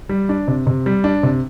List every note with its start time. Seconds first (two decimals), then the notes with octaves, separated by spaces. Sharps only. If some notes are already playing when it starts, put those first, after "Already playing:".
0.09 G3
0.29 D4
0.48 C3
0.67 C3
0.86 G3
1.04 D4
1.23 C3